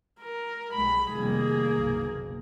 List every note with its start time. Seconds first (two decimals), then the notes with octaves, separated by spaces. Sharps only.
0.20 A#4
0.74 B1 G3 G#3 B5
1.11 F1 D#3 G3 A#3 G#4
1.71 F#1 B1